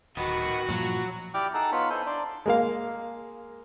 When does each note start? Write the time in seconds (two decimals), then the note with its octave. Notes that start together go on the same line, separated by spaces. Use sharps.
0.17 D1 D#3 B3 F#4
0.69 G2 A#2 F3 F#3
1.34 E4 G4 D5 G5 D6 F6
1.54 D#4 G#4 A4 F#5 A5 A#5
1.72 B3 D#4 F4 C#5 B5
1.90 D#4 E4 A4 C5 G#5 C6
2.06 D4 D5 C6
2.46 G#3 A#3 F5